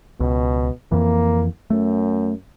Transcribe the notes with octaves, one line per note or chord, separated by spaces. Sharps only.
C#2 B2
F2 E3 A#3
F#2 A3